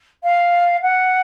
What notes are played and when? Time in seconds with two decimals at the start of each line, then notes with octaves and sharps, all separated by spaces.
0.24 F5
0.82 F#5